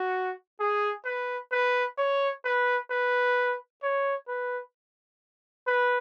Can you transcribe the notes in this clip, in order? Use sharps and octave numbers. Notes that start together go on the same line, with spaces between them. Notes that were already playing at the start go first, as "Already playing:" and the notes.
Already playing: F#4
G#4
B4
B4
C#5
B4
B4
C#5
B4
B4